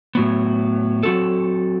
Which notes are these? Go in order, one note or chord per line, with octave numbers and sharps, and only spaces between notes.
A2 F#3 B3
F#3 C4 F#4 A4